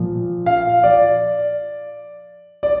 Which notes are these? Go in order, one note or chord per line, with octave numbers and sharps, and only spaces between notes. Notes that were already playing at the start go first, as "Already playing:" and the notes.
Already playing: A#2 F3
F5
D5
D5